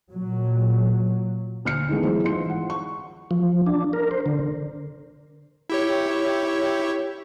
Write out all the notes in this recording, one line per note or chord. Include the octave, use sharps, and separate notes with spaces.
A#2 F#3
D2 F6 C#7
D#3 E3 G#3 A3 B3
F#3 G#3 E4 C5
A1 G#2 F4 C6 C#7
F#5
C#6
F3
D4
A#4
C5
D3
E4 G4 C#5